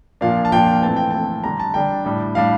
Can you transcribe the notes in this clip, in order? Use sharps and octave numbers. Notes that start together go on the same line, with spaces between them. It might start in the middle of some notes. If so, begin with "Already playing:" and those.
A#2 F3 A#3 D4 F5
A5
A#2 F3 A#3 D4 G5
E3 A3 C4 A5
G5
E3 A3 C4 A5
D3 G3 D4 A#5
A5
D3 G3 D4 G5
A2 G3 D4
A2 G3 D4 F5